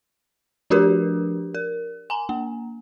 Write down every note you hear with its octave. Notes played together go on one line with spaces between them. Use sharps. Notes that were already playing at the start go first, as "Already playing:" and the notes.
F3 D4 F#4 G4 A#4 B4
A#4
G#5 A#5
A#3